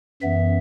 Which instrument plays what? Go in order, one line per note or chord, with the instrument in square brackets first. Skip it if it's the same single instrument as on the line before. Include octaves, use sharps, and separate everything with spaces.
[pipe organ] F#2 E3 B3 E5